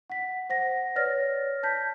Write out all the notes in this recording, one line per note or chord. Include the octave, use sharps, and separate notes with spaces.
F#5 B6
C5 F#5 A#6
B4 C#5 D5 F6 A6 A#6
A5 G6 B6